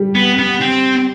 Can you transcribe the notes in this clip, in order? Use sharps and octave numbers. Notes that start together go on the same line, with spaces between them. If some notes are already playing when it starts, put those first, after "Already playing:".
Already playing: G3 G4
B3
B3
C4